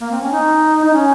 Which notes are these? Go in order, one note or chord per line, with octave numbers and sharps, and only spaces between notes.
A#3
C4
C#4
D#4
D#4
C#4